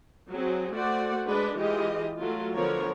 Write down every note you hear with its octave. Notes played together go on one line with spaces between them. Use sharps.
F#3 C4 G#4
A3 F#4 C5 D5 F#5
G#3 D4 B4
E3 G#3 F4 G4 G#4 D#5
F#3 A3 F4
D3 F3 B3 A#4 C#5